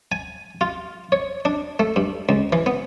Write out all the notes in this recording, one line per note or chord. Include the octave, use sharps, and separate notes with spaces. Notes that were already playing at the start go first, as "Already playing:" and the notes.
G#5
F4
C#5
D4
A3
G2
C#2
E3
B3